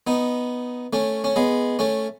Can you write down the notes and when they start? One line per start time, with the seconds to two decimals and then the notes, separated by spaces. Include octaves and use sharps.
0.07 B3 D#4
0.93 A3 C#4
1.24 C#4
1.36 G#3 B3
1.79 A3 C#4